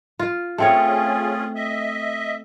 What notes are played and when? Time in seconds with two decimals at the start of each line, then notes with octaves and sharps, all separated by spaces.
0.19 F4
0.58 A3 C4 C#4 F4 G#4 C#5
1.55 D#5 E5